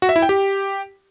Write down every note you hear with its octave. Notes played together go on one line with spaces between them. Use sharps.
F#4
E5
E4
G5
G4